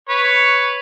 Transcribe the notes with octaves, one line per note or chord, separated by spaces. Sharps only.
B4 C#5